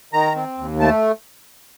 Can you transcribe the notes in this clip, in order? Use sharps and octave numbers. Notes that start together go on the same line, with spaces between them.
D#3 A#5
C4
D#2
A3 A5